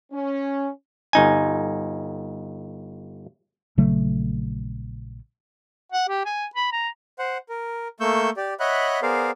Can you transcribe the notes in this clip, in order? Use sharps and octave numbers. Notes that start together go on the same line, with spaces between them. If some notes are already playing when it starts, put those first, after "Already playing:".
C#4
G1 D#4 G#5
A#1 C#3 F#3 A3
F#5
G4
G#5
B5
A#5
C5 F#5
A#4
A3 A#3 C#6 E6 G6
G4 D5
C#5 D#5 E5 F#5 B5 F#6
B3 G#4 A#4 C5 D5 F5